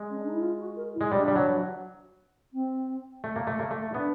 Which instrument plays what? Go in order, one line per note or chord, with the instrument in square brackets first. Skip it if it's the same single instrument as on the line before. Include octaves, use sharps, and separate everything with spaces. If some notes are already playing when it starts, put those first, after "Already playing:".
Already playing: [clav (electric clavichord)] G#3
[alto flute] C#4
D4
D#4
E4
F4
F#4
A#4
E4
[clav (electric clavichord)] G#3
[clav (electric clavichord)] G3 [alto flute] D4
[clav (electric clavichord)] G3
F#3
[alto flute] C4
[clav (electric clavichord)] A3
A#3
A3
A#3
A3
[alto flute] D#4
[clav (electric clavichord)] B3 [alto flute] D4